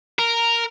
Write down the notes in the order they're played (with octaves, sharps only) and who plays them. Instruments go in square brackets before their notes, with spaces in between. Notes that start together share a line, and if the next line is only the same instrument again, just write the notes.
[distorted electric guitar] A#4